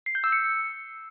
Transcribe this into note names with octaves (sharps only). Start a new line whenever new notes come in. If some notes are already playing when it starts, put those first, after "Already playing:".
C7
G6
E6
C#7